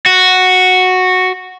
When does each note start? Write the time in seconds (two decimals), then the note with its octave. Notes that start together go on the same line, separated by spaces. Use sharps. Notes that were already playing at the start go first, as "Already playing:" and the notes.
0.06 F#4